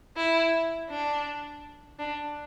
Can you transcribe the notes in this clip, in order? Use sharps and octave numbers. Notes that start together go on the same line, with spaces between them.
E4
D4
D4